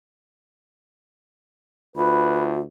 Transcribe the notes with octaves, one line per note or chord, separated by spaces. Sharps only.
D2 F4 B4 B5